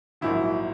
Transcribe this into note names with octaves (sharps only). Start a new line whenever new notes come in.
A#1 G#2 D#3 F#3 E4